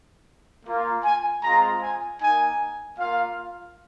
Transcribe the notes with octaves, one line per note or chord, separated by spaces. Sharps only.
A#3 F4
G#5
G#3 C4 F4 A#5
G#5
A#3 D#4 G#5
A#3 F4 F5